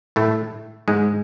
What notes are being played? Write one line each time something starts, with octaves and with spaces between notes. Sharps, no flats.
A2 A3
G#2 G#3